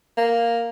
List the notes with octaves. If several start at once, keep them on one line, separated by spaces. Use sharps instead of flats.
A#3